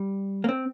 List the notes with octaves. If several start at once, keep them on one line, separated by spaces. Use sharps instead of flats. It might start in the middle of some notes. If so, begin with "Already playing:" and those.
Already playing: G3
A#3
C4